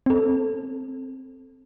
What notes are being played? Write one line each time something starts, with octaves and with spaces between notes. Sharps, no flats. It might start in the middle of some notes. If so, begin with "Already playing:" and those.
C4 A4